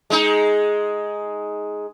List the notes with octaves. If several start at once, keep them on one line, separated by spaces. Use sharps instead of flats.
G#3 D#4